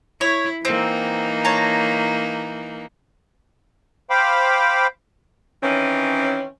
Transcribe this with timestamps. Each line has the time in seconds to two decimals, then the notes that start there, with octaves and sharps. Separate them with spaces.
0.21 E4 C#5
0.65 E3 A#3 C4 D#4
1.45 C#5 A5 A#5
4.10 C5 F5 G5 B5 D6
5.63 D#3 E3 C4 C#4